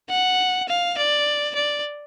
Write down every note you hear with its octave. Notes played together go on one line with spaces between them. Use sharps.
F#5
F5
D5
D5